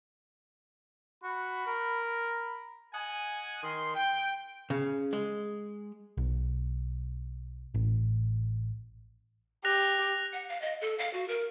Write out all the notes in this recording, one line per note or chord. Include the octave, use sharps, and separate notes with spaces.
F#4 B5
A#4
D#5 F#5 G#5
D#3 C6
G5
C#3
G#3
B1
A1
G4 F#6 A#6 F7
F#5
F5
D#5
A4
F5
F#4
A#4